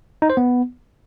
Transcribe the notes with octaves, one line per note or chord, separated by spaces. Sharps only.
D#4
C5
B3